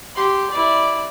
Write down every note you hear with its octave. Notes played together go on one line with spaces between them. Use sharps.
G4 C6
E4 D5